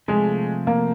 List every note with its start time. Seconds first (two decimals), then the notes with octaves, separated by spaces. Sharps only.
0.08 C3 F3 G#3 A3
0.67 A#3